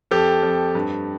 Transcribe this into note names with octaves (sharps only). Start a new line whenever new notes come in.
F2 G4 A4
F2
G2